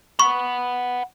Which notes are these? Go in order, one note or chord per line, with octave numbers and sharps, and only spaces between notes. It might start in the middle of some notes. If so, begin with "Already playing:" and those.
F#5 B5 C#6